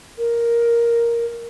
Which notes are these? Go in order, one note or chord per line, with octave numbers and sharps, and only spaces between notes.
A#4